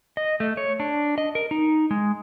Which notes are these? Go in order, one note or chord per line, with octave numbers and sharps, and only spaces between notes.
D#5
A3
C#5
D4
D#5
A#4
D#4
G#3